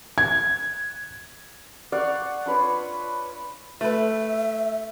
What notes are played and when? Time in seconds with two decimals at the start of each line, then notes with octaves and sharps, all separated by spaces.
0.18 G#6
1.92 D5 F5 F#5 C#6
2.46 D4 F4 B4 C#5
3.81 A3 B4 E5